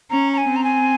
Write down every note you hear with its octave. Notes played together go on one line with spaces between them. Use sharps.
C#4 A#5
A#5
G#5
C4
A#5
G#5